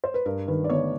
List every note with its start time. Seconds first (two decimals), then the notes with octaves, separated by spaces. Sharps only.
0.04 C5
0.14 B4
0.26 G2 A#4
0.48 D#3 B4
0.64 D5
0.70 G1 C#5